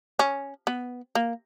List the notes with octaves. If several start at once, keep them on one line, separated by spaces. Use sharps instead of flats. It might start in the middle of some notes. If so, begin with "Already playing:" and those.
C#4
B3
A#3